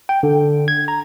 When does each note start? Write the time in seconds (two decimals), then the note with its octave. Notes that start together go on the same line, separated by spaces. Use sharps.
0.09 G5
0.23 D3
0.68 G#6
0.88 A#5